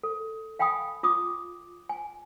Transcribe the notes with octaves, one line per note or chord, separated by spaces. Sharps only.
A4
F5 G5 G#5 B5 D#6
F4 D6 D#6
G#5